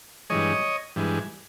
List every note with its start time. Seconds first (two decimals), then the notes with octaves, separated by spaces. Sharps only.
0.30 G2 E3 G#3 C#5 D#5
0.96 G2 E3 G#3